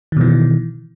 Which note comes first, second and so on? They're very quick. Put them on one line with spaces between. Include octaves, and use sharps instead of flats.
D#3 B2 E3